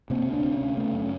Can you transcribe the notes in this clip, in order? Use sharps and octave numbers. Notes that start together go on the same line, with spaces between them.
C3 A#3 C4
D2
C4 D4
C3
B3 C#4
D2
C#3 A3 B3
F#2
C#4